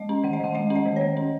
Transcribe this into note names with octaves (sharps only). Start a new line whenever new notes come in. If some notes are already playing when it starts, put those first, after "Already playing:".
Already playing: G#3 D#5
C#4
D#3 F#5
D#5
D#3 F#5
G#3 D#5
C#4
D#5
D#3
D#3 C#5
C#4